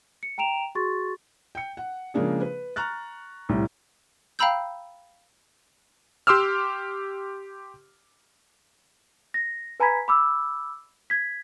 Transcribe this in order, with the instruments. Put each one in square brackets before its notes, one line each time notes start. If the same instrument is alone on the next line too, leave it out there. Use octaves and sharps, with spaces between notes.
[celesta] C#7
G5 A#5 D7 E7 F7
F#4 G#4 C6 C#6 A6
[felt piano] G5 C#7
F#5
C#3 F3 G#3 A#3 D4 G#4
B4
A#5 C#6 F6 F#6 A6
C2 A2 G3
[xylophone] F5 G5 A#5 B5 E6 G6
[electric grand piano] G4 C6 D6 E6 F6
[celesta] A#6
B4 G#5 A#5 B5 G#6 B6
B5 D6 E6
G#6 B6